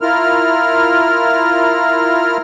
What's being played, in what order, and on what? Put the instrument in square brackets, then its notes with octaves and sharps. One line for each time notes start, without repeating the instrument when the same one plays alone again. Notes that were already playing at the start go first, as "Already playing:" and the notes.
[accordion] E4 F4 A#4 F6